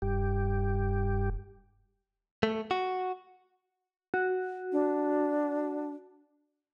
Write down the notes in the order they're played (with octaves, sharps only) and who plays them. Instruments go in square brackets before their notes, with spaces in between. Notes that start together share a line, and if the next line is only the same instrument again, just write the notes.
[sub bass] E1 [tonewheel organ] G2 G4
[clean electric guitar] A3
F#4
[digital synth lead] F#4
[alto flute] D4